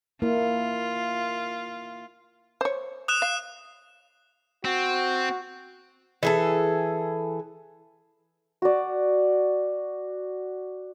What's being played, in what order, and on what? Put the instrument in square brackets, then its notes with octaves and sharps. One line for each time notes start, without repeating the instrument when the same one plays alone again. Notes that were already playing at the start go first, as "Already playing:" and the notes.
[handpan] A#3 E4 [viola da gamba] F4
[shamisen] C5 C#5
[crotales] D#6 F#6 E7
[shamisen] F5
[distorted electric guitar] C4 [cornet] F#4
[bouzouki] E3 G#4 A4
[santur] F#4 D5